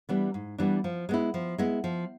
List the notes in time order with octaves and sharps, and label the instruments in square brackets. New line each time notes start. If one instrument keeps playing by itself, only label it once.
[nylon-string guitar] E3 G3 B3 D4
G#2
E3 G3 B3 D4
F3
G#3 B3 E4
F3
G#3 B3 E4
F3